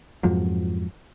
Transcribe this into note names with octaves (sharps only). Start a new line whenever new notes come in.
F2 G#2 F3 F#3